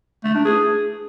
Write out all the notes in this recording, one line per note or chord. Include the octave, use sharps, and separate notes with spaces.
A3
D4
G#4